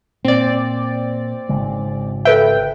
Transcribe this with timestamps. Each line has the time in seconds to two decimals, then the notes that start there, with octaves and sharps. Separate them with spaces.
0.25 A#2 C4 D5
1.49 G#1 C#3 G#3
2.25 A4 B4 E5 G5